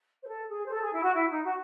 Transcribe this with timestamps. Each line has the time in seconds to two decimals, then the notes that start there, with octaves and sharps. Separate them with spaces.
0.21 C5
0.26 A4
0.47 G#4
0.64 C5
0.70 A4
0.81 G#4
0.91 E4
1.02 F#4
1.13 E4
1.29 D#4
1.43 F#4